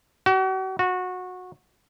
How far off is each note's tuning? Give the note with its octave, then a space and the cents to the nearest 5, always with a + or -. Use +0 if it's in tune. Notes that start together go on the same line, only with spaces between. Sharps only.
F#4 +40
F#4 -20